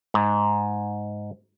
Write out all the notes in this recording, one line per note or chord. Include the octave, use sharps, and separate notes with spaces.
G#2